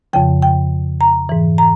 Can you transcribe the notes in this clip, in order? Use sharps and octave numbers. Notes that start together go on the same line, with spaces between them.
F2 C#3 F3 G5
G5
A#5
G#2 E3
A#5